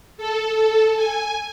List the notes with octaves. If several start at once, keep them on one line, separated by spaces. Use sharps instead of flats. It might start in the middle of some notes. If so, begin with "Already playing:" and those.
A4
A4
G#5